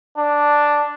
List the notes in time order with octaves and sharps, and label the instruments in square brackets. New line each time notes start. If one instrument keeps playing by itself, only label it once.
[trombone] D4